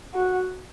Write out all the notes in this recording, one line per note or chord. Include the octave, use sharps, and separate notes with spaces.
F#4